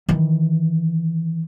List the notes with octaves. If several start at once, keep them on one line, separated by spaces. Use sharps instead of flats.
D#3 E3